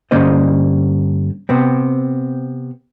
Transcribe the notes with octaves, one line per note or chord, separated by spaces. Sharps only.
G2 D3 A#3 C#4 C5 D#5
C3 B3 C4